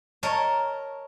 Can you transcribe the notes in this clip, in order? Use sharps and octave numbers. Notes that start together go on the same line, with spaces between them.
A#4 C#5 D#5 A5